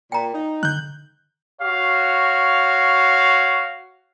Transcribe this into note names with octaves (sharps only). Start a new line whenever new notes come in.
A#2 G5 A#5
D#4
D3 F#6 G6
F#4 C#5 F5